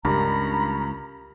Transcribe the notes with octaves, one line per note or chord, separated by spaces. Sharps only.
C#2 G2 G4 A#4 A#5 B5